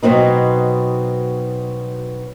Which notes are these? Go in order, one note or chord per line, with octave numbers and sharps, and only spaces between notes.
B2 F#3 C4 D#4